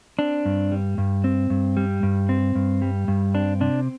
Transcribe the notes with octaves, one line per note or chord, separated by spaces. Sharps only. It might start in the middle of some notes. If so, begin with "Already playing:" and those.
C4 D4
G2
G3
G2
C4
G2
G3
G2
C4
G2
G3
G2
C4 D4
C3 D4